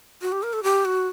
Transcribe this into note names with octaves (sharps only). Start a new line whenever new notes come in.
F#4
G4
A#4
A4
G4
F#4